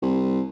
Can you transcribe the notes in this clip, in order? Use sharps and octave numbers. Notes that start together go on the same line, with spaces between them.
C2